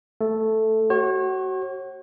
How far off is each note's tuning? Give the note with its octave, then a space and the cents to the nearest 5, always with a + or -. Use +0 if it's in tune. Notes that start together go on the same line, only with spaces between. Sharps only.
A3 +0 A4 +0
F#4 +30 C#5 -40